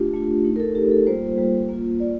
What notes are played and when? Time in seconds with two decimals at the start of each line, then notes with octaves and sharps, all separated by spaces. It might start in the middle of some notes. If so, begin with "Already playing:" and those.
Already playing: A3 D4 F4 G4
0.14 A3 D4 F4
0.44 A3 D#4
0.56 A#4
0.60 A4
0.75 A3 D#4 G4
0.91 A4
1.07 G3 A#3 F4 C5
1.38 G3 A#3 F4
1.69 A#3 F4
2.00 A#3 F4 D5